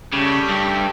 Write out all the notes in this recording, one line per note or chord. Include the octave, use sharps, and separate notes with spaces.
C#3 G3 A3 G4
G2